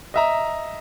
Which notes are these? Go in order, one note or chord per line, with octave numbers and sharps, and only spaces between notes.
D#5 E5 A#5